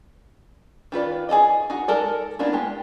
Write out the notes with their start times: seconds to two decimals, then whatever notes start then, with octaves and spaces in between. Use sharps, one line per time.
0.92 D#3 F4 B4 D5
1.29 G#4 A4 D5 D#5
1.70 D#4 F#4
1.88 G#3 A4 A#4 D5
2.39 A#3 B3 D4 E4 A#4
2.53 G#3 G4